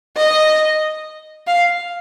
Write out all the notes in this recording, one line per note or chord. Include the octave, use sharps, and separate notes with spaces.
D#5
F5